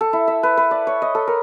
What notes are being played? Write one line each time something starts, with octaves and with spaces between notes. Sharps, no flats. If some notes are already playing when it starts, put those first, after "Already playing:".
A4
E4
E5
B4
B4
D5
C#5
D#5
A4
A#4